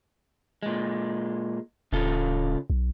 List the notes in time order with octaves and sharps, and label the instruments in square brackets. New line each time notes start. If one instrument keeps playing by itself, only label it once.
[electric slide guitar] A#2 G#3
[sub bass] D1 [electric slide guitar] C#3 F4 A4
[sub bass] B1